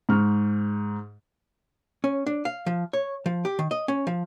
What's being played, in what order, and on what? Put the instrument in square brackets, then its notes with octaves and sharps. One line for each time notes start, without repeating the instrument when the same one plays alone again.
[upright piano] G#2 C#6 F6
[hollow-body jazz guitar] C#4
D4
F5
F3
C#5
F3
G4
D#3
D#5
C#4
F3